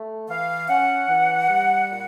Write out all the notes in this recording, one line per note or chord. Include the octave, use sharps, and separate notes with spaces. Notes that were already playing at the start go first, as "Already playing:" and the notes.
Already playing: A3
E3 F5
C#4 F#5
E3
G3
A#2